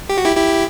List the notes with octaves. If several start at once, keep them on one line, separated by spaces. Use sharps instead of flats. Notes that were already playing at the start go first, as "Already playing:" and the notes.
G4
F#4
E4 G4
E4 G4